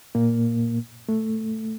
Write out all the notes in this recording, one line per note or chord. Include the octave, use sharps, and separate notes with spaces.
A#2 A#3
A3